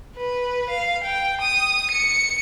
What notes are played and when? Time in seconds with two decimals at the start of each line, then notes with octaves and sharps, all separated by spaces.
0.16 B4
0.69 F5
1.04 G5
1.41 D#6
1.91 C#7